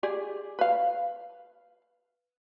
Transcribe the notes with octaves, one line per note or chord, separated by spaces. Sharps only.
G4 G#4 D5
B4 F5